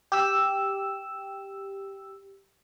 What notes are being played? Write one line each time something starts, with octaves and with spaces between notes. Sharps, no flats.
G4 E6